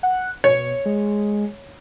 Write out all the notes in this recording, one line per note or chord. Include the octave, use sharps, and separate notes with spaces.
F#5
B2 C#5
G#3